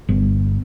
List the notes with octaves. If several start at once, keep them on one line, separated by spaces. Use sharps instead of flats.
G1